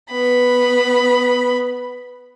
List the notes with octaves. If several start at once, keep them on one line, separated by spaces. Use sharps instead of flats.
B3 B5